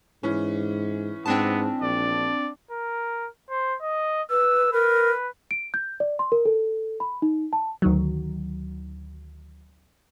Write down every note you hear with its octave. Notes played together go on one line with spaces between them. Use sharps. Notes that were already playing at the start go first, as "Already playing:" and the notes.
G#2 E3 C#4
G#2 B3 C4 D4 A5
A#1 D5
A#4
C5
D#5
B4 E6
A#4 B4
D7
G6
D5
C6
A#4
A4
B5
D#4
A5
D2 D#3 F#3